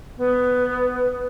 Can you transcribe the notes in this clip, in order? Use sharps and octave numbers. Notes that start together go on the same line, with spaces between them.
B3